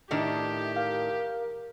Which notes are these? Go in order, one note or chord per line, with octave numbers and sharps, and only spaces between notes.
A2 D#3 D4 G4 E5
A#4 F5